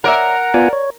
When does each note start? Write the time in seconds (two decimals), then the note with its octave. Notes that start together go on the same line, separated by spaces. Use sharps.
0.04 A#4 C#5 D5 E5 F#5 A#5
0.54 B3 F4 D5 G#5
0.73 C#5